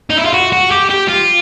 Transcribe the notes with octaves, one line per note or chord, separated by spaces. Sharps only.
D#4
E4
F4
F#4
F#4
G4
G4
F4